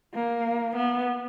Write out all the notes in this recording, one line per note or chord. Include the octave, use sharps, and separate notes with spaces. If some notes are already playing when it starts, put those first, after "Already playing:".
A#3
B3